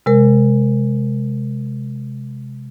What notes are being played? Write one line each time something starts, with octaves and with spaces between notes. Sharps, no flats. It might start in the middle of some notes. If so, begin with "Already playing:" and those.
C3 G#3 A#4